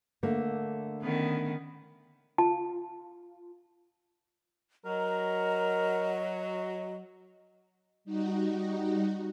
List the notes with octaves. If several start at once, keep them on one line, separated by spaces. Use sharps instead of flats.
D3 A3 A#3
D#3 B3 C#4
F4 A5
F#3 A#4 D#5
G3 D#4 F#4